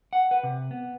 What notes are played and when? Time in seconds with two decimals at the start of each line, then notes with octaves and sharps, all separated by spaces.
0.13 F#5
0.31 B4
0.43 C3
0.71 B3